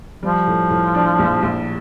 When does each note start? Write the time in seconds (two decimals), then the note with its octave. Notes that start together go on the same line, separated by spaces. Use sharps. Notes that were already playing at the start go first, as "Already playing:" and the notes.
0.23 F3 G3
0.47 A2
0.70 A2
0.95 D4
1.19 A#1
1.43 A#1